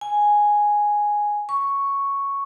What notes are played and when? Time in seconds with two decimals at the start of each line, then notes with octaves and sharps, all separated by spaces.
0.01 G#5
1.49 C#6